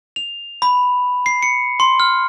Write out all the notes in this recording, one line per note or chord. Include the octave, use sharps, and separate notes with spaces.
F7
B5
C7
C#7
C6
F6